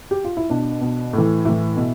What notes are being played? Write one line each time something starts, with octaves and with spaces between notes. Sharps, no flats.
G4
F4
E4
B2 D4
B2
A2 E3
A2 E3 E4
B2